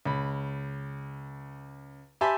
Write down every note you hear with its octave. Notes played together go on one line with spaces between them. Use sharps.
C#2 B5
G4 E5 G#5 A5 B5 C6